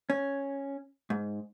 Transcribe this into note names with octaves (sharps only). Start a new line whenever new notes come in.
C#4
G#2